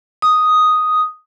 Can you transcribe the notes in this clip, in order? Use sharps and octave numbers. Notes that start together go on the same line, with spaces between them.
D#6